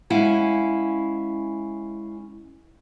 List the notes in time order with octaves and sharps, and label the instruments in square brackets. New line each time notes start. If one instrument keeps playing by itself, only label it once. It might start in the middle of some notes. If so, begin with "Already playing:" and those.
[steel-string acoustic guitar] G#3 C#4 E4 F5 F#5 G#5